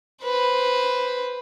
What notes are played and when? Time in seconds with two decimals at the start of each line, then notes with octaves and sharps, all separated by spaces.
0.24 B4 C5